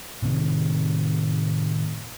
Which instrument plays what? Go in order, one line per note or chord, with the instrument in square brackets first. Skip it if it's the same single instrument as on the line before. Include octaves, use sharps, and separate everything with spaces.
[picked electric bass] A2 C3 D#3